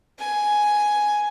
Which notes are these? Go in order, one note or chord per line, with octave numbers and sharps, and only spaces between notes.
G#5